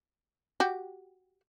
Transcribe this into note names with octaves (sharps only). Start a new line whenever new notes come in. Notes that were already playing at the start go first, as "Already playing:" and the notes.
F#4 G4